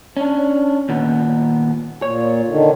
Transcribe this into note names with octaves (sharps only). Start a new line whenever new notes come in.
C#4 D4
D#2 A#2 B3
A#2 C#5
D3 D#3